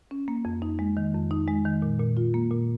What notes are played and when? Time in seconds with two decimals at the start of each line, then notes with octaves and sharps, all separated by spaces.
0.11 C#4
0.28 A#3
0.45 F2
0.62 D#4
0.79 G#3
0.97 D#3
1.14 F2
1.31 D#4
1.48 G#3
1.65 D#3
1.82 A#2
1.99 A#2
2.17 F4
2.34 A#3
2.51 A#2